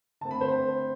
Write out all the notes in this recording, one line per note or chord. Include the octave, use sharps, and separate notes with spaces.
D3 A3 C4 A5
B5
C5